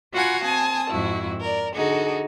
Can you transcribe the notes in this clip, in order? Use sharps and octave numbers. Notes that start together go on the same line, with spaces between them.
F4 F#4 F5 F#5 G#5 B5
C4 G#5 A5 D#6
F2 G#2 E4 F#4
A#4 D5
D3 D#4 F#4 G#4 A4